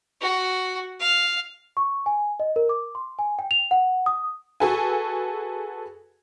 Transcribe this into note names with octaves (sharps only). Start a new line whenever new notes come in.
F#4
F5
C#6
G#5
D#5
A#4
D6
C6
G#5
G5
F7
F#5
D#6
F#4 G#4 A4 B4 G#5